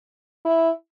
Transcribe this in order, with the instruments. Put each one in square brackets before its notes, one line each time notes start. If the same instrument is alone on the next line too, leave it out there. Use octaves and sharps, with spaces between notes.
[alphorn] E4